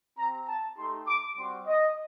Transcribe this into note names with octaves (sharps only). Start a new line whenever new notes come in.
C4 G4 A#5
A5
A3 D#4 G4 C6
D6
G3 C4 F#4 C6
D#5